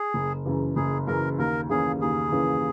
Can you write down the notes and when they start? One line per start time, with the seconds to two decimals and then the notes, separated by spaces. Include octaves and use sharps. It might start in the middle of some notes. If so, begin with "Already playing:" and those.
Already playing: G#4
0.14 F#1
0.45 F#2 C#3 E3
0.76 F#1 G#4
1.07 F#2 C#3 E3 A#4
1.38 D#2 A#4
1.69 C#3 E3 A#3 C#4 G#4
2.01 D#2 G#4
2.32 C#3 E3 A#3 C#4